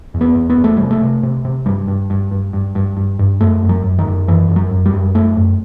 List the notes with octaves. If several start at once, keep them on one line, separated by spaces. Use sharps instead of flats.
E2
B3
E2
B3
E2
A3
C3 G3
A3
C3
C3
C3
G2 G3
G2
G2
G2
G2
G2
G2
G2
F#2 A3
F#2
F#3
F#2
D#3
F#2
F#2 E3
F#2
F#3
F#2
G3
F#2
F#2 A3
F#2